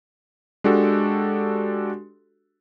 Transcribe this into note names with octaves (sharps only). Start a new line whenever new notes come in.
G#3 D4 F#4 G4 A4